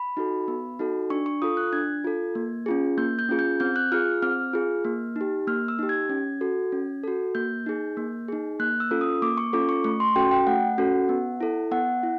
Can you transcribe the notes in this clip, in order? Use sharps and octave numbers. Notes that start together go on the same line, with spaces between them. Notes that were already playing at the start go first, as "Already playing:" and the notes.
Already playing: B5
D#4 F#4 A4
B3
D#4 F#4 A4
D4 C#6
C#6
F4 A4 D#6
F#6
D4 G#6
F4 A4
A#3
C#4 F4 G#4
A#3 G6
G6
C#4 F4 G#4
G6
C4 G6
F#6
F4 G#4 F6
C4 F6
F4 G#4
A#3
D#4 G4
A#3 F6
E6
D#4 G4
G#6
C#4
F#4 A4
C#4
F#4 A4
A#3 G6
D#4 G#4
A#3
D#4 G#4
A#3 F#6
E6
C#4 F4 A4
D#6
A#3 D6
C#6
C#4 F4 A4 D6
C#6
A3 C#6
C6
C#4 F#4 A4 G5
G5
A3 F#5
C#4 F#4 A4
B3
E4 A4
B3 F#5
E4